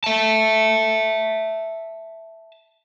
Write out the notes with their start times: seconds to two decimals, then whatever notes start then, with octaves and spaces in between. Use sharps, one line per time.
0.04 E5 A5